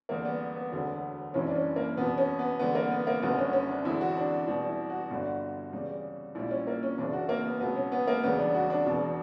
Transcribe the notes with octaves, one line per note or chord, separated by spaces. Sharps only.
E2 D3 G3 A#3
B3
B3
E1 D2 D3 F#3
F#1 F#2 E3 G3 C#4
D4
C#4
A#3
F#1 E2 B2 B3
C#4
B3
E2 D3 G3 B3
A#3
B3
A#3
F#1 F#2 D3 G3 B3
C#4
C#4
D4
E1 E2 D3 E4
F#4
D4
E2 B2 G3
E4
F#4
G1 G2 D3 G3
E2 C#3 G3
A#1 A#2 G3 E4
C#4
A#3
C#4
F#1 E2 C#3 D4
F#4
A#3
B3
C#2 B2 F#3 B3
C#4
B3
A#3
E1 E2 C#3 G3 B3
D4
F#4
D4
E1 E2 B2